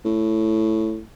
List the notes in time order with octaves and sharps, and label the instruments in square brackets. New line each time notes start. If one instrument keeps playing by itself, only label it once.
[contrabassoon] A2